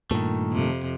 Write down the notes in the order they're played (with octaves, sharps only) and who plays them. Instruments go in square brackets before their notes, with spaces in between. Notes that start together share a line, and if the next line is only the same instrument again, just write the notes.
[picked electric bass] G2 A#2 [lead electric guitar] D#3 A3
[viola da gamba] F2 C3